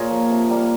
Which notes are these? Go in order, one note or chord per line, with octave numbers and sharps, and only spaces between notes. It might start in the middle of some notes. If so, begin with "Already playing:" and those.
Already playing: A#2 F4 G#4 A#4 C#5
F3 A#3
C3
G3 A#3